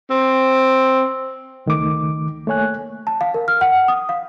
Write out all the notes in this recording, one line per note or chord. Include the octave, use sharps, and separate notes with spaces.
C4
C#2 D#3 A3 D6
A3 A#3 C#5 G#5 F#6
A5
F5
A#4
F6
F#5
D#6
F5